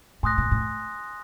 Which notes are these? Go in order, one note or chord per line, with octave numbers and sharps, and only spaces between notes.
A2 G#5 C6 D#6 F#6 A#6
A#2
A2